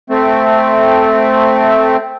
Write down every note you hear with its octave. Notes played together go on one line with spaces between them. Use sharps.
A3 C4